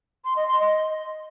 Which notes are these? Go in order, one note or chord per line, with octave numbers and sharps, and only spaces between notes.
C6
D#5
C6
D#5